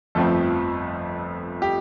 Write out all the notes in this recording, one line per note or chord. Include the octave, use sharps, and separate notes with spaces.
G1 F2 F3 A3 C4 A4
G4